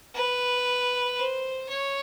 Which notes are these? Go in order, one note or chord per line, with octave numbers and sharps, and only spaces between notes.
B4
C5
C#5